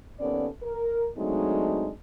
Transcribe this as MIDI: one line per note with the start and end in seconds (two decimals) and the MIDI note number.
0.20 0.48 39
0.20 0.48 58
0.20 0.48 59
0.20 0.48 61
0.20 0.48 69
0.20 0.48 74
0.63 1.08 70
1.17 1.89 54
1.17 1.89 56
1.17 1.89 57
1.17 1.89 60
1.17 1.89 62
1.17 1.89 63